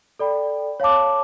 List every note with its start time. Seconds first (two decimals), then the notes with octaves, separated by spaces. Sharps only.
0.19 A4 D5 G5 B5
0.80 C#5 F5 A5 D6